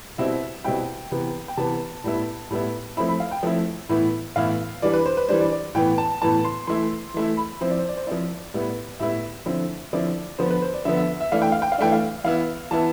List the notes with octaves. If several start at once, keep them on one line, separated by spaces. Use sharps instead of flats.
B2 G3 C4 E4 E5
B2 G3 C4 E4 G5
C3 E3 B3
G5
C3 E3 B3 A5
A2 G3 B3 E4
A2 G3 B3 E4
F3 A3 C4 E4 B5
B5
F5
G5
F3 A3 C4 E4
A2 E3 B3 E4
A2 E3 B3 E4 F5
E3 G3 D4 D5
B4
C5
B4
E3 G3 D4 C5
D5
D5
A2 E3 B3 G5
A5
A2 E3 B3 A5
C6
E3 A3 E4 C6
E3 A3 E4
B5
F3 C4 E4 C5
D5
C5
D5
C5
F3 C4 E4 D5
A2 G3 B3 E4
A2 G3 B3 E4 E5
D3 F3 C4 E4
D3 F3 C4 E4 D5
D3 F3 B3 C5
B4
C5
D5
D3 F3 B3 E5
E5
E5
E3 A3 D4 F5
G5
F5
G5
F5
E3 A3 D4 G5
F5
E3 B3 E4 F5
E3 B3 E4 A5